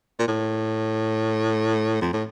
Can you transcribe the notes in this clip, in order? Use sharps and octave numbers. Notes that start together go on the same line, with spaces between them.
A#2
A2
F2
A2